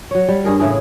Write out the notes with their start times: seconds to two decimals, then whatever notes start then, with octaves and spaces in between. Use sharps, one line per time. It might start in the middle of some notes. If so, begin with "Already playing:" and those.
0.11 F#3 C#5
0.28 G3
0.44 G2 G#4 A#4
0.60 A2 C#3 E3 G#4